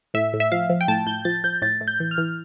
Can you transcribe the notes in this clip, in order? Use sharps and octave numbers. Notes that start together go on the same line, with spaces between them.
A2 E5
A2
E5
F3 F5
F3
G5
A2 A5
A2 G6
F3 A6
F3 G6
A2 A6
A2
G6
E3
F6
E3